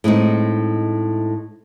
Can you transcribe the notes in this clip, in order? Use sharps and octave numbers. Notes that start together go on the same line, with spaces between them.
A2 G#3 C4 D#4